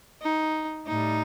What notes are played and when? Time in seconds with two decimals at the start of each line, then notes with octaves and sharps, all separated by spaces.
0.20 D#4
0.86 A2 G3 D#4